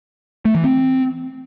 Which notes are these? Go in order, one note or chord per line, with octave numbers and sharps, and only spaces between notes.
A3
E3
C4